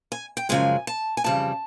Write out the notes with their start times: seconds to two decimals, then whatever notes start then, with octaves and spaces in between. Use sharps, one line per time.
0.12 G#5
0.37 G5
0.49 F#2 C#3 F3 G#3 G#5
0.87 A5
1.17 G#5
1.24 F2 C#3 E3 G3 A5